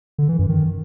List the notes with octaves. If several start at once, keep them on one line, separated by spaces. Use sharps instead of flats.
D3
E3
F#2
D#3